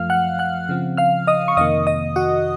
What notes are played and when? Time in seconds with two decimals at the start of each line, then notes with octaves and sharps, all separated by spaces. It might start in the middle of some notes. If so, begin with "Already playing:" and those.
Already playing: F#2 F3 A3 F5 F6
0.10 F#5 F#6
0.39 F#5 F#6
0.69 C#3 F3 C4
0.97 F5 F6
1.27 D#5 D#6
1.48 C#6
1.57 F2 C3 D#3 A#3 D#5 D#6
1.87 D#5 D#6
2.16 F#4 F#5